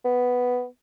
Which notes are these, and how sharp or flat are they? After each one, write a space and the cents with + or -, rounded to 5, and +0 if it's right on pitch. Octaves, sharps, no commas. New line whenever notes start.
B3 +5